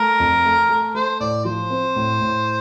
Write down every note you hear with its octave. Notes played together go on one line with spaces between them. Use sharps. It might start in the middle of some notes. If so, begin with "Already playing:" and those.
Already playing: A3 A#4
F2
A3
A3
A3 C5
A2 D5
F3 C5
C4
A2
A2